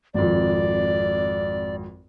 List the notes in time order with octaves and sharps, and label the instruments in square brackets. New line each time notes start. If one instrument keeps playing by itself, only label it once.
[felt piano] G#1 F2 [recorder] D5